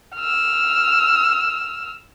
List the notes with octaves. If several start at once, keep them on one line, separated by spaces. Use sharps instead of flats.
E6 F6